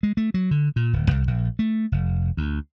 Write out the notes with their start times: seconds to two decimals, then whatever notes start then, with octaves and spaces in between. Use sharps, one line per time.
0.03 G#3
0.17 A3
0.34 F#3
0.51 D3
0.76 A#2
0.93 D1
1.11 C2
1.27 A#1
1.59 A3
1.92 F1
2.37 D2